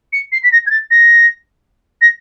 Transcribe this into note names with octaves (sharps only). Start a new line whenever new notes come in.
C#7
C7
B6
A#6
G#6
A6
A#6
A#6